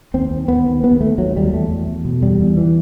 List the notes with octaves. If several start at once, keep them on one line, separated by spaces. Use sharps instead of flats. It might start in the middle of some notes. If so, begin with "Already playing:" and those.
D#2 C4
D#2
D#2 B3
D#2
D#2 B3
D#2 A3
D#2 F#3
D#2 G3
E2 A3
E2
E2
B2
E2 G3
E2
E3